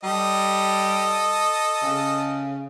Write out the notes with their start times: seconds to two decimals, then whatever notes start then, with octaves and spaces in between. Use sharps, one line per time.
0.03 G3 A4 D#5
1.82 C#3